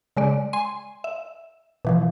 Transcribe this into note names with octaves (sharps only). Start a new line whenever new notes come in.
C#3 G#3 D5
G#5 C6 D#7
E5
B2 E3 F3